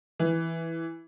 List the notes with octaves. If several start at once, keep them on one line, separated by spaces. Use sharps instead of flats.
E3